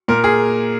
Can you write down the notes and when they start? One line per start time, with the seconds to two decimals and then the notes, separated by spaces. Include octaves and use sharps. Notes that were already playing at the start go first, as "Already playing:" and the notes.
0.08 A#2 A#4
0.24 G#4